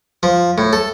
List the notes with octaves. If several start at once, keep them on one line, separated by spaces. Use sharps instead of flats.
F3
A2
A4